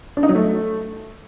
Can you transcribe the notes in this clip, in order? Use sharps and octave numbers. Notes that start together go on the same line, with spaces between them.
D4
D#4
F#3
A3